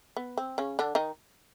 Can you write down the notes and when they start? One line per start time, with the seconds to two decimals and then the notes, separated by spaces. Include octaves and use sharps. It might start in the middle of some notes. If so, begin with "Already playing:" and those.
0.16 B3
0.37 C4
0.58 C#3 C#4
0.79 D3 D4
0.95 D#3 D#4